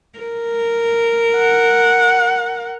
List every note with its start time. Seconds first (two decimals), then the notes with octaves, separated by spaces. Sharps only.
0.19 A#4
1.37 F#5